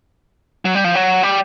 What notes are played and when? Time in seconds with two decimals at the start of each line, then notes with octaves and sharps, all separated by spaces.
0.65 F#3
0.75 G3
0.84 F3
0.95 F#3
1.23 G3